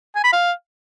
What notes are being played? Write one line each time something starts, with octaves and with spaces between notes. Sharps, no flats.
G#5
B5
F5